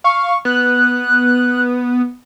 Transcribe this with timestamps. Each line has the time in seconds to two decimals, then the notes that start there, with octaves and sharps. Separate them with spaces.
0.04 F5 C#6
0.45 B3 F#6